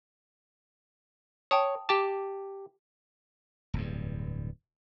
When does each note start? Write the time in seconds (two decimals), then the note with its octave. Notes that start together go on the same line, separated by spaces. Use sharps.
1.51 C#5 G5 A5 D#6
1.89 G4 A5 D6
3.74 D1 E2 G2